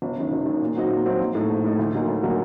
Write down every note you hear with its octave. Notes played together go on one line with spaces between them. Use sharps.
G1
F#2 D#3
G1
F#2 D#3
A#2
F#3 C4 D#4 F#4
A#2
F#3 C4 D#4 F#4
A#1
A2 A3 D#4
A#1
A2 A3 D#4
D2
D3 F#3 A#3 D#4
D2
D3 F#3 A#3 D#4